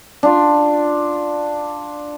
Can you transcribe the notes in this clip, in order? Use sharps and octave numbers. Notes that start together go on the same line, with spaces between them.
D4 F4